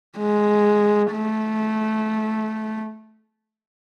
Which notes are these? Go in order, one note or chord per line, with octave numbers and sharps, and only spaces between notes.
G#3
A3